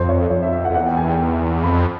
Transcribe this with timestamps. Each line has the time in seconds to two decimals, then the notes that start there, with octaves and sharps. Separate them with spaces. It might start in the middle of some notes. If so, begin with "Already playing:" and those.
Already playing: F2 C5
0.09 C#5
0.30 F2 C#5
0.43 E5
0.53 E5
0.65 F#5
0.70 F2
0.75 E2 F#5
0.86 G5
0.97 G#5
1.08 G5
1.63 F2 B5